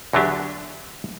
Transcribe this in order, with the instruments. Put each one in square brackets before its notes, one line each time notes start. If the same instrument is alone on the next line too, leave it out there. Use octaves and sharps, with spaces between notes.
[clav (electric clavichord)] E2 D3 F#3 D4 G4